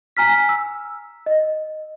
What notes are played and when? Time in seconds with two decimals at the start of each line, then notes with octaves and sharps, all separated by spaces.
0.17 G#5 A#5 F6 B6
0.49 E6
1.26 D#5